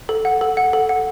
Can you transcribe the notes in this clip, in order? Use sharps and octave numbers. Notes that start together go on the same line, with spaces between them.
A4
F#5
A4
F#5
A4
F#5